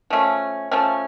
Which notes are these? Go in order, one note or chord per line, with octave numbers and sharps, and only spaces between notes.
F3 A3 C#4
F3 A3 C#4